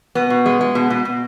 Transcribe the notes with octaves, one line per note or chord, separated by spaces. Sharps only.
B2 B3
B2
G#3
G#3
B2
B2
B2